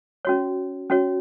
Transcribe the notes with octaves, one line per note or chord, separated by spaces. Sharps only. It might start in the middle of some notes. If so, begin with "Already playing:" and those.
C#4 F#4 C#5
C#4 F#4 C#5